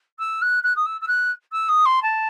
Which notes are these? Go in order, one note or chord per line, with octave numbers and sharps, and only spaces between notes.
E6
F#6
F#6
D#6
E6
E6
F#6
E6
D#6
C6
A5